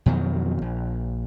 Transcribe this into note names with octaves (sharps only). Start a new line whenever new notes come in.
F2 B2 D#3 F#3
A#1